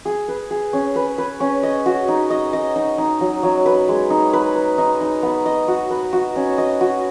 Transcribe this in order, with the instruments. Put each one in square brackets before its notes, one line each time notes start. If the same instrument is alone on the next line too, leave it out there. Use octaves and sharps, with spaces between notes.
[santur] G#4
B4
G#4
C#4
B4
B4
C#4
D#5
F#4
D#4
D#5
D#5
D#4
D#4
F#3
F#3
B4
G#3
D#4
B4
B4
D#4
D#4
B3
D#5
F#4
B4
F#4
C#4
D#5
F#4